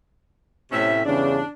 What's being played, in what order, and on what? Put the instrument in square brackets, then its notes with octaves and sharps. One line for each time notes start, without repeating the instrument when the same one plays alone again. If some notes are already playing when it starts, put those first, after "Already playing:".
[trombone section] A2 [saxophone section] C3 C#4 E5
[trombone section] E2 G2 C#3 [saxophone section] D4